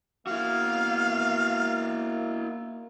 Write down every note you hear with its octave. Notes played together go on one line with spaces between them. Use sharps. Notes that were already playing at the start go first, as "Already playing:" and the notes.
A#3 E4 F#4 F5